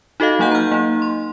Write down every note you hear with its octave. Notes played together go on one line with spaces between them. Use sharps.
D#4 F#4 A4 D#5 F5
F#3 A#3 D#4 F#5 G6
A#5 F6
A#3 D#4
C6